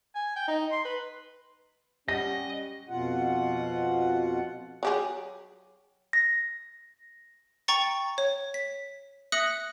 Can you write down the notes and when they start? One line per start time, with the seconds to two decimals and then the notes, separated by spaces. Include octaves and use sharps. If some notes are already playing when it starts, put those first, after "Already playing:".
0.15 G#5
0.36 G5
0.48 D#4
0.72 C6
0.85 B4
2.08 G3 C#4 G4 D#5 F#5 A#6
2.89 F2 B2 F4 F#5
4.83 F#3 G4 G#4
6.13 A#6
7.68 G5 A#5 C#6 A6 C#7
8.18 C#5
8.54 B6
9.32 E5 D#6 F#6 A#6 C#7 F#7